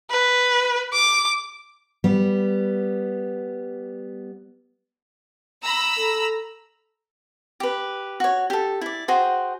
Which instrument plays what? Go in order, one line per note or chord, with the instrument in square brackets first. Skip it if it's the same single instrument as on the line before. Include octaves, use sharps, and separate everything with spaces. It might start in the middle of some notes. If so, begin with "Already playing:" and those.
[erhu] B4
D6
[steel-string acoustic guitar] G3 B3
[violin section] A#5 B5 E6
[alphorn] A4
[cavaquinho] G4 B4
F#4 C#5
G4 A4
E4 D5
F#4 G#4 C5 G5